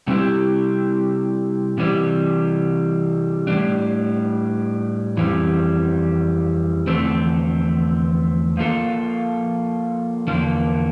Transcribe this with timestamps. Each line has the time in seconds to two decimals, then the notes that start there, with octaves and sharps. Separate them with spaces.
0.07 C3 G3 C4 E4 G4
1.78 C3 E3 G3 C4
3.47 A2 G3 D4
5.17 F2 E3 G3 C4
6.87 E2 D3 F3 A3 C4
8.57 F3 A#3 F4 A4
10.27 E2 D3 F3 A#3